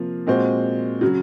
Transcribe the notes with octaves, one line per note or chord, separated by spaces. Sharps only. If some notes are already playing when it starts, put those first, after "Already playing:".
Already playing: C3 F3 A#3 F4
A#2 G#3 C4 F#4 C5
C#3 F#3